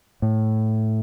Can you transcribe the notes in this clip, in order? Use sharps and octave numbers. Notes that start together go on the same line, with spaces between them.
A2